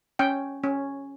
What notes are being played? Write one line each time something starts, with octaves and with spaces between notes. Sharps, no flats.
C#4 G5
C#4